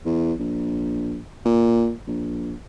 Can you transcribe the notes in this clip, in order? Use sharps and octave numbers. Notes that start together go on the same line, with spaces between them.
E2
A#1
A#2
A#1